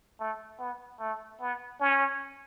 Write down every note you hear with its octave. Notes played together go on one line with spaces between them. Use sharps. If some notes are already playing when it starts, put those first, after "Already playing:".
A3
B3
A3
B3
C#4